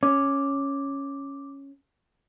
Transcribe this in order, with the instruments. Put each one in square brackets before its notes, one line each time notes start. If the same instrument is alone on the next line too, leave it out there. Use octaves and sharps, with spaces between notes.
[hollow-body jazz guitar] C#4 [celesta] D6